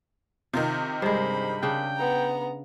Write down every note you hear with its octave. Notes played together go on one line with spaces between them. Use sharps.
C3 D#3 F4
G2 G#3 C5 B5
C#3 D4 G5
B3 A#5